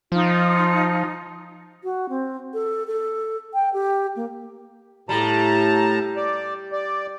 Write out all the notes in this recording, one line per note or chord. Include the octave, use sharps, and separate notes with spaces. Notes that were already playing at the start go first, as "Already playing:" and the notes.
F3 D#4 F4
F#4
C4
A4
A4
G5
G4
A#3
A2 G3 A5 A#5
D5
D5